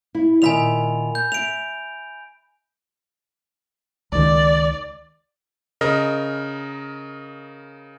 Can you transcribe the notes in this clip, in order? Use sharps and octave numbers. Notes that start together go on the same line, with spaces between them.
E4
A#2 D#3 E5 G#5 B5 F7
G6
E5 D7 F7
C#2 D#3 D5
C#3 A#4 D#5